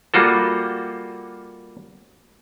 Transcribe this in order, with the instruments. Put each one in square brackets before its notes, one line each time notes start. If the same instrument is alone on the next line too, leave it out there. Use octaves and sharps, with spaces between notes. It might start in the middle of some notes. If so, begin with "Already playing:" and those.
[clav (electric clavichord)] G3 A#3 F4 F#4 A4